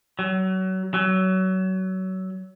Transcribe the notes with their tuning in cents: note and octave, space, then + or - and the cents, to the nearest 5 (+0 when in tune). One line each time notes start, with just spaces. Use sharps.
F#3 +30
F#3 +25